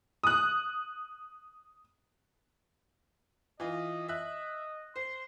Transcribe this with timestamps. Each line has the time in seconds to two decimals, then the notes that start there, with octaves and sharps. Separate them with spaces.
0.23 D#6 F#6
3.60 E3 F4 D#5
4.09 D#5 E5 F#6
4.96 C5 C6